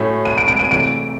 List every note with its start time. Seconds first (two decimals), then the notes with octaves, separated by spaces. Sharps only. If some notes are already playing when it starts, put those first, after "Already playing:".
Already playing: A2 F#3 A3 C#4
0.25 D#7
0.38 D7
0.48 D7
0.59 D#7
0.71 C3 E3 A3 D7